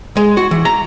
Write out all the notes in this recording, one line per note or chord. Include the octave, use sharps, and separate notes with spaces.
G#3
F#4
E3
A#5